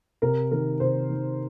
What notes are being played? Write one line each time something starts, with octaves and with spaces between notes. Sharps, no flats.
C3 A#4
D#3 A#4
C3 C5
D#3